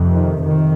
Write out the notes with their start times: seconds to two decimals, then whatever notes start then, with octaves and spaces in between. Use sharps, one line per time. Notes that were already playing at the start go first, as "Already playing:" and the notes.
Already playing: F2 C3
0.14 D#3
0.43 F2 C3 D#3